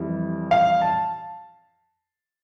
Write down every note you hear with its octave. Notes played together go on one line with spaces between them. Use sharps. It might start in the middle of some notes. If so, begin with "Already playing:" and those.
Already playing: F2 E3 G3
F5
A5